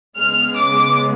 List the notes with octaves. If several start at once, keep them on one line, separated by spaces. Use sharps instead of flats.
C#3 G#3 B3 F6
D6